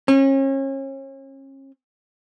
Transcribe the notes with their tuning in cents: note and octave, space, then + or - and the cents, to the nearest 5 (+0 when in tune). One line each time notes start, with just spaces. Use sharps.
C#4 -35